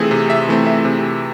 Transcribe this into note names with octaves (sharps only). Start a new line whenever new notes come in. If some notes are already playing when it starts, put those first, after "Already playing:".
Already playing: C3 E3 A3 C4 F4 G#4
C3
E5
E3 A3 C4
E5
C3